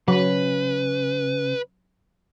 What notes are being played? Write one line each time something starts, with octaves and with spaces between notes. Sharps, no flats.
C#3 F#3 B4